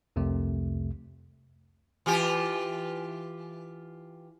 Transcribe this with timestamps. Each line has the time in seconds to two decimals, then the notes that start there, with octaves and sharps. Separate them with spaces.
0.16 C2 F2 C3 A3
2.06 E3 F4 G4